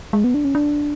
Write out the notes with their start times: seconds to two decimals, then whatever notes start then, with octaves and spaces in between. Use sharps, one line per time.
0.13 G#3
0.24 B3
0.34 D4
0.45 C#4
0.55 D4